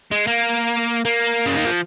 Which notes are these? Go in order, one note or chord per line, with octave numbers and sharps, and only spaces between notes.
G#3
A#3
A#3
C#3
D#3
F3